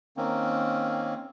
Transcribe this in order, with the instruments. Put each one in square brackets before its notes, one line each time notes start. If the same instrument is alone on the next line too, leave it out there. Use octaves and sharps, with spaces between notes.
[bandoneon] D#3 A#3 C4 C#4